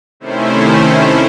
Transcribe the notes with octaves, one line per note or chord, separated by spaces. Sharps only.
C3 D#3 A3 C#4 E4 C5